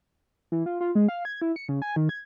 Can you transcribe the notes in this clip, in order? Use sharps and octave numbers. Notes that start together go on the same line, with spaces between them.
E3
F4
F4
G#3
F5
G#6
E4
C#7
C#3
G#5
D#3
G#6